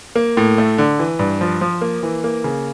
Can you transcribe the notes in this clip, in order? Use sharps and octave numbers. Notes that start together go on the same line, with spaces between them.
A#3
A2
A3
D3
E3
G2
F3
F3
A#3
E3
A#3
C#3